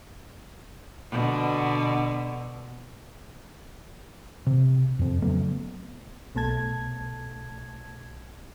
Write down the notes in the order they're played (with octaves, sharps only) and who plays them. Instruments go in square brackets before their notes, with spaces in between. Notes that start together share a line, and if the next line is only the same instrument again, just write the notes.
[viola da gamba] B2 D3
[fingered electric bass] C3
F2 C4
C#3 F#3 A3 B3
[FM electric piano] B1 B2 A3 A5 G#6